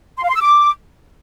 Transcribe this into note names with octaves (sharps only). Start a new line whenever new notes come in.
C6
F5
C6
E6
D6